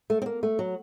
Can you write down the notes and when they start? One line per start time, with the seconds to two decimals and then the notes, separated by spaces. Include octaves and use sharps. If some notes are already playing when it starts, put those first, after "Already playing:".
0.10 A3
0.22 C4
0.26 A#3
0.43 A3
0.59 F#3